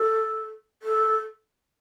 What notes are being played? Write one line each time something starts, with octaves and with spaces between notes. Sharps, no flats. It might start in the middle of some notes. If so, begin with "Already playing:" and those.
Already playing: A4
A4